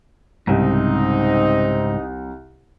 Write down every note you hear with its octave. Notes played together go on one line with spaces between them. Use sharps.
C2 G#2 C#3 C4 D#4